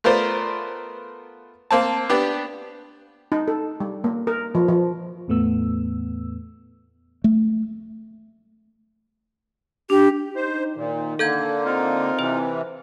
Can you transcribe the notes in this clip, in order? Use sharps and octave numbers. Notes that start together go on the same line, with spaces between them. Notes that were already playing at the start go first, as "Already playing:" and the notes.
A3 B3 F4 A#4 C5 D5
A#3 C4 A5
B3 D4 G4
D#4
A4
G3
A#3
A#4
F3
F3
E2 A2 A3 B3 E6
A3
D4 G4
D#4 C5
A#2 D#3
D3 A#3 A4 G6 G#6
C4 D#4 F4 A#4
C3 E3 C5